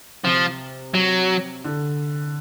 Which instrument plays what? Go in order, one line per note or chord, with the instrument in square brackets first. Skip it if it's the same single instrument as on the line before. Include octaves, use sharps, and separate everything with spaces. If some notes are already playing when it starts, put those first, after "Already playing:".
[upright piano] C3 [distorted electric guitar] F3
[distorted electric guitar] F#3
[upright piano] D3